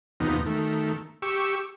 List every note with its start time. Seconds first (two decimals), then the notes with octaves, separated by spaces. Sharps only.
0.20 D#2 C3 F3 B3 D#4
0.46 D#3 A3
1.22 G4 C#6 E6